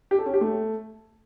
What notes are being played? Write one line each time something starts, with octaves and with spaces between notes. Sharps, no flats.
G4
A4
C#4
G4
A3